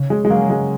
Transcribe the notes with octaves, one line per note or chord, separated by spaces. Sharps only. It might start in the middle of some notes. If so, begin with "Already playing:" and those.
Already playing: C#3
G#3
G#3
F#3 A#3 C#4 G#4
G#3